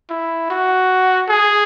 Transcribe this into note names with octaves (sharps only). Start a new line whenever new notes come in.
E4
F#4
G#4